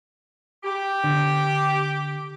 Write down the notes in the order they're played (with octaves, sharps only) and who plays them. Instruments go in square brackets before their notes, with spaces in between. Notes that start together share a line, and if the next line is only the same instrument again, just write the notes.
[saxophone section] G4
[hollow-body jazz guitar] D3